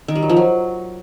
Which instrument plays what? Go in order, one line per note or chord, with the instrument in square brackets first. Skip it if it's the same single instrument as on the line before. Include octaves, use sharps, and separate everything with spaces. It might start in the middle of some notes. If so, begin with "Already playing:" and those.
[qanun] D#3
G3
F#3
F3
F#3